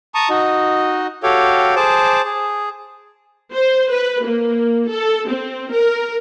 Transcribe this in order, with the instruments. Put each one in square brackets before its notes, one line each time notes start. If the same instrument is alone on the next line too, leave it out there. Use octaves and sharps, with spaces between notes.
[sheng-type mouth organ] A5 A#5 C#6 D#6
D#4 F#4 D#5
F#4 G4 A4 C#5 F5 G5
G#4 C5 A5 D6
G#4
[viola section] C5
B4
A#3
A4
C4
A#4